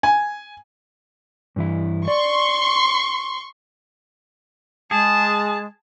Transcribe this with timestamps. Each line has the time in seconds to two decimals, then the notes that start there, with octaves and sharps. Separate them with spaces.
0.03 G#5
1.56 G2 E3 E4
2.08 D5 C6 C#6
4.91 G#3 G#4 A5